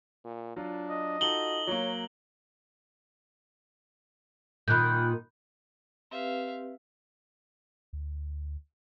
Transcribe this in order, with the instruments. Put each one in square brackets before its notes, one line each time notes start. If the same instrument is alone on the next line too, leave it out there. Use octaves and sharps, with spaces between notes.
[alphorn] A#2
[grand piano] F#3 F4 [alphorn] D4
[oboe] D#5
[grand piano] D#4 F4 A4 [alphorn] F#4 [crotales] F#7 G7
[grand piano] F#3 A#3 [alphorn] C#5
[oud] A#2 D#3 [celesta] B5 F#6 G6
[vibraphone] C4 G4 B4 [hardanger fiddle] E5 F5
[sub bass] D2